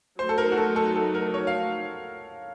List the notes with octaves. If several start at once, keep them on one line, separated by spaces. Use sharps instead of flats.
F#3 A3 D#4 C5
A4
A#4
F#4
A4
A4
A4
A#4
C#5
F5